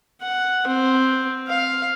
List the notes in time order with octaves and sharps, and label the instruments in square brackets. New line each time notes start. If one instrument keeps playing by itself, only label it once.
[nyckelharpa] F#5
C4
F5